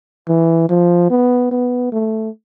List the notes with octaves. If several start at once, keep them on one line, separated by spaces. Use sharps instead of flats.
E3
F3
B3
B3
A3